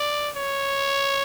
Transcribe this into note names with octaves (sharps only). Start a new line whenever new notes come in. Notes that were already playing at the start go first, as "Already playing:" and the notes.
Already playing: D5
C#5